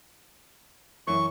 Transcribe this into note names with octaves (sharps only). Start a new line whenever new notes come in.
F#2 E3 C#6